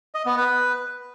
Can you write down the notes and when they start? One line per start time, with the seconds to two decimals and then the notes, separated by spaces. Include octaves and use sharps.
0.15 D#5
0.26 B3
0.37 B4